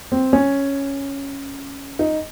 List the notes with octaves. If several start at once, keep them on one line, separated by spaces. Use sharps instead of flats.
C4
C#4
D#4